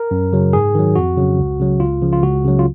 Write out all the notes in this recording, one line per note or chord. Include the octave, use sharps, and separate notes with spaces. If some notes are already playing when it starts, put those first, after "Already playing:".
Already playing: A#4
F#2
C#3 F#3
G#2 G#4
D#3 F#3
F2 F#4
C#3 F#3
C#2
C#3 F#3
C#2 F4
C#3 F3
F4
C#2 F#4
C#3 F#3
F4